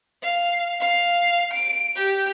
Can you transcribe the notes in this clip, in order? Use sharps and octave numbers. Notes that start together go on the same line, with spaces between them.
F5
F5
D7
G4